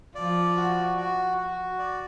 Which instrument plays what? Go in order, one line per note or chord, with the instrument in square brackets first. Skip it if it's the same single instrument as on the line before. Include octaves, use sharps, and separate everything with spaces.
[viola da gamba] F3 [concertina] D5
[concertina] F#4
F#4
F#4
D5